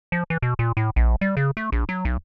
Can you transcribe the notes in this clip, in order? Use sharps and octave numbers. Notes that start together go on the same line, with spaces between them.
F3
E3
B2
A#2
A2
A#1
G3
C#3
A3
A#1
F#3
B1